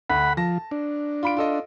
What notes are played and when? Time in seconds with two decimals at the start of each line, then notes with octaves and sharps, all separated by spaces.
0.10 D2 F#5 B5
0.37 F3 A5 A#6
0.71 D4
1.23 F4 B5 D7
1.37 F4 A4 D#5